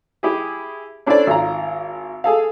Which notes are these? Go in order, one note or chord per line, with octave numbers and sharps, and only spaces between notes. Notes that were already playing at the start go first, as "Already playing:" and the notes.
E4 G4 G#4
C#4 D4 E4 A4 C5 D5
G#1 F4 A#5
G#4 A4 F5